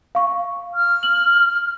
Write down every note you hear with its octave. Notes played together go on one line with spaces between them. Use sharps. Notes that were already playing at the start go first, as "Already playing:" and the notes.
F5 C#6
F6
F#7